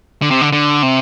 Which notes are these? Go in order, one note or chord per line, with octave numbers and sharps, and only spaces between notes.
D3
C3
D3
D3
C3